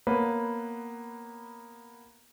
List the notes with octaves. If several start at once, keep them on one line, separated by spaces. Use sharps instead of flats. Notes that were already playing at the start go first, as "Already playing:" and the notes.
A#3 B3 B4 C#5